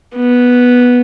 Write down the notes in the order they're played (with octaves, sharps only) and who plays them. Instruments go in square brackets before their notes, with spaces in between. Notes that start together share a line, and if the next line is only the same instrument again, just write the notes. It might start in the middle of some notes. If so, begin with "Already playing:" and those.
[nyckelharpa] B3